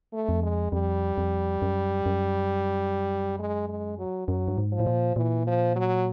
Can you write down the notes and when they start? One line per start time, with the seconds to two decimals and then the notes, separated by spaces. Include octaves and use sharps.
0.13 A3
0.29 F2
0.43 G#3
0.72 F2 G3
1.17 F2
1.62 F#2
2.06 F#2
3.39 G#3
3.69 G#3
3.98 F#3
4.28 F#2 F#3
4.48 G2
4.58 G#2
4.72 F3
4.80 A2
4.87 A#2
5.16 A#2 E3
5.47 F3
5.76 F#3